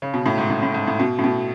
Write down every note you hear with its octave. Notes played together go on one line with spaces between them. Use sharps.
C#3
B2
A2
G#2
A2
A2
G#2
A2
B2
A2
B2